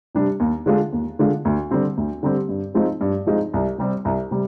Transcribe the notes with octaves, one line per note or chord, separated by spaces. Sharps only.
C3 G3 D4
D#2
D3 G#3 D4 F4
D#2
D3 G#3 D4 F4
D2
D3 G3 C4 G4
D2
D3 G3 C4 G4
G2
F3 G#3 C4 D#4
G2
F3 G#3 C4 D#4
C2
C3 G3 C4
C2
C3 G3